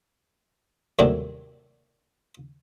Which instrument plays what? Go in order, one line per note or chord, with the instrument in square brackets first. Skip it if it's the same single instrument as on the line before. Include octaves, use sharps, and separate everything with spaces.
[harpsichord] D#2 A2 C3 F#3 G3 D4